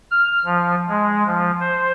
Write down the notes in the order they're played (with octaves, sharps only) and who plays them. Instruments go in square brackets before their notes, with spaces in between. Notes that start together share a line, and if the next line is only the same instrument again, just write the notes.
[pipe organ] F6
F3
G#3
F3
C5